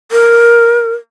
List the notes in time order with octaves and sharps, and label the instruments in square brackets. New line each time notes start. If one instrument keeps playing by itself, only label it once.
[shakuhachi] A#4